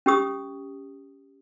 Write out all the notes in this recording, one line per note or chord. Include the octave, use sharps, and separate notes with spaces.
C#4 G4 D#6